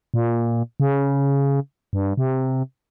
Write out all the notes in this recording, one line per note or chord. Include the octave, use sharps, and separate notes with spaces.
A#2
C#3
G2
C3